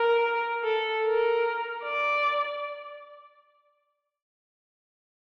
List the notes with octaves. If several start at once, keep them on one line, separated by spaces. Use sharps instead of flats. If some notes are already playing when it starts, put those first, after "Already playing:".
Already playing: A#4
A4
A#4
D5